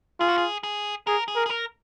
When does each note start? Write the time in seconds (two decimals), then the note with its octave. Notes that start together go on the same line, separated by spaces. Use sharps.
0.20 F4 G#4
0.29 F#4
0.38 G#4
0.63 G#4
1.07 G#4 A#4
1.28 G#4
1.36 A#4
1.46 G#4
1.49 A#4